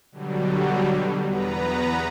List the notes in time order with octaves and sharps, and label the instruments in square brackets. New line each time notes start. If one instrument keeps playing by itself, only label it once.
[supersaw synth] B2 D3 F#3 G3
E2 B3 B4 A#5